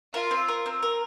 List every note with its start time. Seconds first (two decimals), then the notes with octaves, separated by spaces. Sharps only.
0.14 F4 A#4
0.31 C4
0.48 A#4
0.66 C4
0.82 A#4